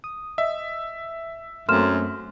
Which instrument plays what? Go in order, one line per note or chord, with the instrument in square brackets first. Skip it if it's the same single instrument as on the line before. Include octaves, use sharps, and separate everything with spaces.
[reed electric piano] D#6
[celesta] D#5 [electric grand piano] E5
[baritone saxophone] F#2 [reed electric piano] A3 A#3 C4 [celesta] C6 F6 E7